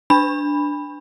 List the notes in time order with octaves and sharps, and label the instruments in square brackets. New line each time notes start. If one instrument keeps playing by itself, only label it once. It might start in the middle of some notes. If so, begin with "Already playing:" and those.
[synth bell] D4 B5